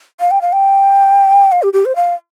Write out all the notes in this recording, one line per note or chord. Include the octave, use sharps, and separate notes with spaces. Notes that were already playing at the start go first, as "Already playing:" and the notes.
F5
G5
F5
G5
F5
G4
G4
C5
F5